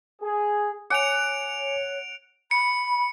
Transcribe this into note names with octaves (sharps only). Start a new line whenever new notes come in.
G#4
C#5 F#5 G#5 D6 C#7 D7 F7
B5 C#7